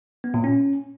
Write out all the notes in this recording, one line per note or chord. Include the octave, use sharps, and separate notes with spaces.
B3
A#2
C#4